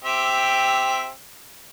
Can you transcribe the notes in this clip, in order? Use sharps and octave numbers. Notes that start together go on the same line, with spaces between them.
C4 G4 E5